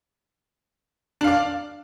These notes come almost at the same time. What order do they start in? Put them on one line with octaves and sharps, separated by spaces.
D4 F5 D5